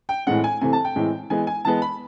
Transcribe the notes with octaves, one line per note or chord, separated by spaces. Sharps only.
G5
A2 E3 G#3 C4 F#5
G#5
C3 E3 A3 C4 G#5
A5
G5
A2 E3 G#3 C4
E3 G#3 B3 G#5
G#5
E3 G#3 B3 A5
B5